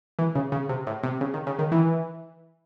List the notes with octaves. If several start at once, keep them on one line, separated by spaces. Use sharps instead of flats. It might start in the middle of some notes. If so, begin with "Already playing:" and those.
E3
C#3
C#3
C3
A2
C3
C#3
D#3
C#3
D#3
E3